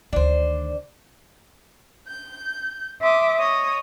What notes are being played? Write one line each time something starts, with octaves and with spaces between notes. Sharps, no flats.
D2 D#3 D4 C5
G6
E5 C6 D6 D#6
C#5 D#5 D#6